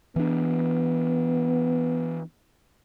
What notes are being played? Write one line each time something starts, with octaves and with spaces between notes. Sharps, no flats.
E3 B3 D4